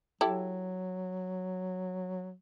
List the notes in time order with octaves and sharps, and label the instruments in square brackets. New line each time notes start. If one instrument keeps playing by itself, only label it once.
[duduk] F#3 [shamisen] E4 G4 A4